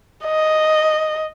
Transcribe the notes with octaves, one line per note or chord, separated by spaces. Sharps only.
D#5